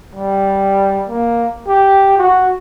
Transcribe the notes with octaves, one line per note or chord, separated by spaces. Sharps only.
G3
A#3
G4
F#4